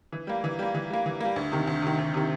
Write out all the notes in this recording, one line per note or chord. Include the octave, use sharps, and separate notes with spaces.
E3
G3 A#3
E3
G3 A#3
E3
G3 A#3
E3
G3 A#3
D2
C3 D#3
D2
C3 D#3
D2
C3 D#3